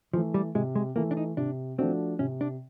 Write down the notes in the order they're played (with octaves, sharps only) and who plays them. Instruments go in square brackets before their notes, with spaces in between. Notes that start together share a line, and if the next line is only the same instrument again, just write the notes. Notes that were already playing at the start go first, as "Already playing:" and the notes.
[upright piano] E3 A3 [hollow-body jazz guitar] F3
[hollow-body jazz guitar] G3
[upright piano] C3 [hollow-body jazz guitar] G#3
[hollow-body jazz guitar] G#3
[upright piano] E3 A3 [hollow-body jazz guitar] A#3
[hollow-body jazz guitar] D4
D#4
[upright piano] C3 [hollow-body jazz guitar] D4
[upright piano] F3 A3 D4 F#4 [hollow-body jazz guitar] C4
[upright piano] C3 [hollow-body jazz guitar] C#4
[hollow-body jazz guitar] D4